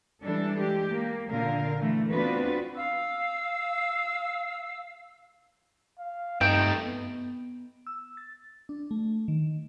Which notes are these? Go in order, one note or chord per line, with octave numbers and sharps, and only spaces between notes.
E3 G3 D4 A4
G#3 G4
A#3
A#2 D3 A#4 F5
E3 A3
B3 C4 D4 F4 F#4 B4
F5 E6
F5
G2 C3 A3 D#4 G5
B3
E6
A6
D4
A3
D#3